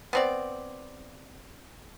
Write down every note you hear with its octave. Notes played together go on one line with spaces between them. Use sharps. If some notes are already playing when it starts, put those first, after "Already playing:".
B3 C4 D5